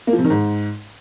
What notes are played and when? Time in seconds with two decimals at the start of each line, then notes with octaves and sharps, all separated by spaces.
0.07 A#3
0.13 F3
0.19 C3
0.24 D#3
0.30 G#2